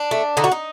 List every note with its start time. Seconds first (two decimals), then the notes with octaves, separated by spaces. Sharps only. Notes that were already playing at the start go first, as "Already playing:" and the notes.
Already playing: D4
0.11 A3
0.37 D3 D#4
0.44 F#4
0.51 D#4